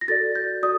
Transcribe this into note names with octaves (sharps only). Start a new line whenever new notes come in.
A#6
F#4 A4 D5 A6
G6
F#4 A4 D5 D#6